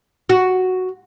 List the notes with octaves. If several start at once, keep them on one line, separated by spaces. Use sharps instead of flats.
F#4